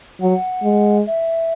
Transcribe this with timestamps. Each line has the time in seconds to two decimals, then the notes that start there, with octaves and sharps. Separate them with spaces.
0.21 F#3 F#5
0.63 G#3
1.06 E5